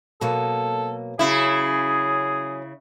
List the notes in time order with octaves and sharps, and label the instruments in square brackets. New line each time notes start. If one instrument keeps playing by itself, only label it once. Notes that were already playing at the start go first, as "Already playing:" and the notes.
[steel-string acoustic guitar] B2 F#3 A#3 [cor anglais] A4
[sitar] C#3 E4 [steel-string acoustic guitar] F#3 C#4 [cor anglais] G#4